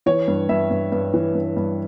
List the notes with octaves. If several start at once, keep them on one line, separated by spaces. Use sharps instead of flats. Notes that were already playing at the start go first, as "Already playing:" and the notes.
E3 C#5
G2
G2 E5
G2
G2
E3
G2
G2